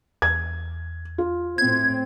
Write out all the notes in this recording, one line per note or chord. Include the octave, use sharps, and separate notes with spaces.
E2 G#6
F4
A2 C4 G#6